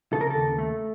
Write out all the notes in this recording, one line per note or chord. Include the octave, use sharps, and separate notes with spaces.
C#3 A4
A#4
D#2 A4
A3